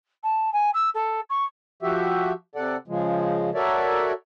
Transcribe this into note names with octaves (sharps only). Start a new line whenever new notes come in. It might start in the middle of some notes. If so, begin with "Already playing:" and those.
A5
G#5
E6
A4
C#6
F3 F#4 G4 E5
C3 A4 D5 F#5
C#3 F3 G#3
F#4 A4 A#4 C#5 D5 E5